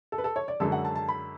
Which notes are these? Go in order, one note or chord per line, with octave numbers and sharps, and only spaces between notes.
A4
B4
A4
C#5
D5
F#2 D3 G#3 A4
F#5
A5
A5
B5